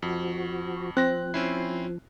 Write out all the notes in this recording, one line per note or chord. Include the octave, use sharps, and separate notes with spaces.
F2 F3 F#4
F3 C4 F#6 A#6
C4 C#4 E4 C7